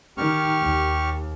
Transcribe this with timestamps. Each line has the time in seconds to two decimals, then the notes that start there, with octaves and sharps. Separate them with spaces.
0.17 D#3 G4 C#6 F6
0.61 D#2